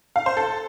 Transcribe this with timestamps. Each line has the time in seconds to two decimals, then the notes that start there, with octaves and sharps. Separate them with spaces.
0.16 F5
0.26 C5
0.37 A4